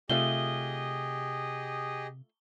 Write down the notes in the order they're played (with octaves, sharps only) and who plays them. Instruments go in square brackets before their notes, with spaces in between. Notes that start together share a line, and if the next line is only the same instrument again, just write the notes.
[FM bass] C3 [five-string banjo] A3 F4 E5 [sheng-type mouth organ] G4 G#4 D#5 [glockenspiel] G7